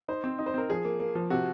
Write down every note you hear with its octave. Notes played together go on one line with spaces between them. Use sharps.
D#4 C5
C4
D#4
C5
C4 A#4
F3 G#4
A#3
A#3
F3
C3 F#4